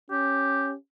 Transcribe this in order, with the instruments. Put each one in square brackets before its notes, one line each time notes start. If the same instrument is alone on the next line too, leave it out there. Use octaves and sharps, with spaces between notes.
[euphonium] C#4 [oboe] G4